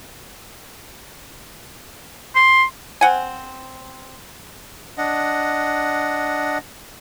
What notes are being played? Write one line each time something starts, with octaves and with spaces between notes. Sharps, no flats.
C6
C4 F#5 G#5
D4 D#5 F#5